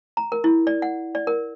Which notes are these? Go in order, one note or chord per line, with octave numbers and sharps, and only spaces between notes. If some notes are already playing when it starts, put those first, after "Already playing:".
A#5
A#4
E4
D5
F#5
D5
A#4